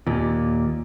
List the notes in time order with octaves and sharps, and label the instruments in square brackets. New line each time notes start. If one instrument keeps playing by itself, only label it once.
[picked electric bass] D#2 A#2